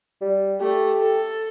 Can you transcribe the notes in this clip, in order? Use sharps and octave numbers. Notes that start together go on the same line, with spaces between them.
G3
A3 G4
A4